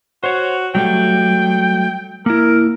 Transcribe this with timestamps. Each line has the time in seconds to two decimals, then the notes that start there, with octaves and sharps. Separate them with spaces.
0.24 F#4 C5 C#5
0.75 F#3 G3 A3 G5
2.26 A#3 E4 A#4